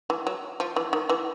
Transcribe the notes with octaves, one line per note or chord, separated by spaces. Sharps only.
E3
F#3
F3
E3
D#3
E3